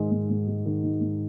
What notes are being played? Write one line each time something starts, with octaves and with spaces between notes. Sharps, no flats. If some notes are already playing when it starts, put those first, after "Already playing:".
Already playing: G#2 D#3 G#3
G#2
G#2
G#3
D#3
G#2
G#2